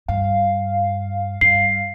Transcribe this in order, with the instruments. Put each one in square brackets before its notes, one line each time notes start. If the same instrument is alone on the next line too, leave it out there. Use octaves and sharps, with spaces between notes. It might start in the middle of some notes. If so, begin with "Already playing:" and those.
[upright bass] G2 [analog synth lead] F5
[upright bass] G2 [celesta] C7